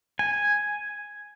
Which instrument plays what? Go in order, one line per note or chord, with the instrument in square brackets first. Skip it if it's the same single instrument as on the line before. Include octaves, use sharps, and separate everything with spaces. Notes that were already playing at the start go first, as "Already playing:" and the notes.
[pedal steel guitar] G#5